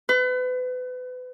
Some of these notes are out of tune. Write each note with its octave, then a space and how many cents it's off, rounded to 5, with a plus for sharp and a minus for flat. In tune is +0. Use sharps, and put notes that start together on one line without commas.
B4 +35